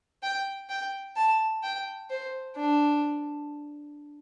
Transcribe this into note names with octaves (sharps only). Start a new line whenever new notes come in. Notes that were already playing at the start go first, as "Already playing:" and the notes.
G5
G5
A5
G5
C5
D4